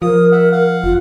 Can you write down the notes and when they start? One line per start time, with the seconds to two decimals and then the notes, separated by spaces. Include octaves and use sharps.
0.02 F3 A#4 D#6
0.32 E5 F#5
0.52 F5 F#5
0.84 F#1 F4